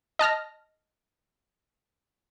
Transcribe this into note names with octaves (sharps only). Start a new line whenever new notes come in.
D#5 A5 F6 A#6